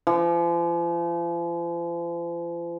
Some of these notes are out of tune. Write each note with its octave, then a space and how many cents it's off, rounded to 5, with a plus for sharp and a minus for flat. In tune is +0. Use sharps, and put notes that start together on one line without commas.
F3 -40